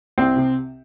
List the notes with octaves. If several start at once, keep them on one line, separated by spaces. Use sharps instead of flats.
C2 C4
C3